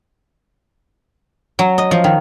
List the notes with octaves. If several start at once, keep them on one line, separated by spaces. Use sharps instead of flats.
F#3
D#5
F3
D#3